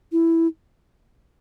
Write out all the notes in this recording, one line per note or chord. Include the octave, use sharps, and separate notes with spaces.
E4